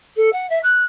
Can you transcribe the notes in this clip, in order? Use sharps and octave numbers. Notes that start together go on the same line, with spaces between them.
A4
F#5
E5
F#6